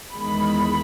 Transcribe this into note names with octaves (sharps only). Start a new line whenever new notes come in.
E2 D#3 G#3 B5